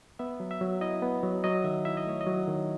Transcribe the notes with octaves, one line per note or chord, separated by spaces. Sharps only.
B3 E5
F#3
E5
F#3
E4 D#5
B3
F#3
F#3 D#5
D#3 E5
E4 E5
D#5
A3 C#5
D#5
F#3
D#3